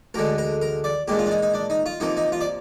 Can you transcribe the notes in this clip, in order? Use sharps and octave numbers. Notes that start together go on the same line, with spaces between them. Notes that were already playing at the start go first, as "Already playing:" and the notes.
D2 D3 G#3 A#4
A#4
A#4
D5
A#2 G#3 D4 G4
F4
D4
D#4
D#4
D4
D#4
F4
C3 F3 A#3 D#4
D#4
F4
D5